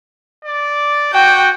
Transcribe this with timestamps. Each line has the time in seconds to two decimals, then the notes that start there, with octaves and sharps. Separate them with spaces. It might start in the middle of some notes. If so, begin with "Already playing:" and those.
0.45 D5
1.13 F#4 G5